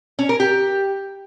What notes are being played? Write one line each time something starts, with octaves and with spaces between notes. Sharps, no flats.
C#4
A#4
G4